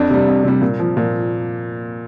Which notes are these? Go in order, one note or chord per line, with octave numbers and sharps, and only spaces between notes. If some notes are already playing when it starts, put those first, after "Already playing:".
Already playing: F2 D4
C3 G3
F2
C3 G3
A#2
F3
A#2